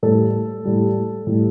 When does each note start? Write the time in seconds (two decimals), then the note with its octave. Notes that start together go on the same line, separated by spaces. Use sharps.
0.03 A2 G3 A4
0.65 A2 G3
1.27 A2 G3